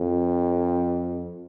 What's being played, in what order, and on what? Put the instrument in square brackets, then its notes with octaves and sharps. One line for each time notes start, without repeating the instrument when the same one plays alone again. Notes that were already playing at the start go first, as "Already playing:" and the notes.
Already playing: [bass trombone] F2